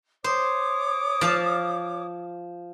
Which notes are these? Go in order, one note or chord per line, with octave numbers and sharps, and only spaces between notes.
C5 C#5 D6 D#6
F3 F5 A5